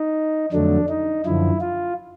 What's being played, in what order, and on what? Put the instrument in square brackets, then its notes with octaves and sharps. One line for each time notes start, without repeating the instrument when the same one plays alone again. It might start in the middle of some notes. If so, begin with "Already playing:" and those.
Already playing: [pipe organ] D#4
F2 D3 F#3 A3 D4
D#4
F#2 D3 F3 E4
F4